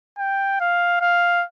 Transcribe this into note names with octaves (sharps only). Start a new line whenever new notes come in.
G5
F5
F5